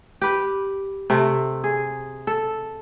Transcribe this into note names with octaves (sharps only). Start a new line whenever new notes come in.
G4 B4
C3 A3
G#4
A4